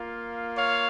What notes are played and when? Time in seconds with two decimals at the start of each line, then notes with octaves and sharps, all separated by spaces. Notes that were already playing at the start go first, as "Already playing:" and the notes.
Already playing: A#3 F4
0.57 C#5 F5